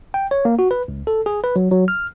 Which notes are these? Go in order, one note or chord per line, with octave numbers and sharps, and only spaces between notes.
G5
C#5
A#3
F#4
B4
C#2
A4
G#4
B4
F#3
F#3
F6